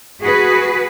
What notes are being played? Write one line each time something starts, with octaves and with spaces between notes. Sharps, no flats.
F#4 G#4 B4